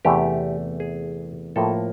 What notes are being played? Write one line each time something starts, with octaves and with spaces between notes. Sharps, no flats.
E2 C3 E3 A3 G4
G#4
A2 F3 A#3 A4